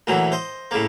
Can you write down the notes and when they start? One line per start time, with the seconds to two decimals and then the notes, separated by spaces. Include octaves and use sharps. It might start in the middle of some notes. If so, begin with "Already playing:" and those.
0.07 D2 A#2 E3 F#3
0.32 C5 D#5
0.71 A2 C#3 A#3